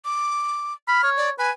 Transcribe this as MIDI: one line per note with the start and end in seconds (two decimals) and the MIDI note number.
0.05 0.73 86
0.88 1.03 83
0.88 1.10 89
1.03 1.30 73
1.17 1.30 74
1.39 1.50 71
1.39 1.51 80